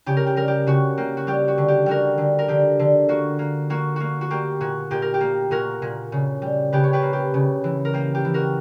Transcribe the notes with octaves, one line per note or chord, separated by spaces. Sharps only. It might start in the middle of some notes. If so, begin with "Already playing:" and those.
C#3 G4
A#4
G4
G3 A#4
G4
C#3 F#4
A#3 G4
F#4
G3 G4
F#4
D3
G4
G3 F#4 A#4
D3
A#4
D3 G4
D3
A#3 F#4
A#3
A#3 F#4
A#3 F#4
F#4
A#3 G4
A#2 F#4
A#2 G4
A#4
G4
A#3
A#2 F#4 A#4
A#2
C#3
G3
C#3 G4 B4
C#5
G4 B4
A#3
G4
C#3
E3
A#4
A#3 G4
G4
E3
F#4 A#4